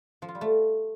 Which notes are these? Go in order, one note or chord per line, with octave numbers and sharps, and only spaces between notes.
F3
F4
G3
A3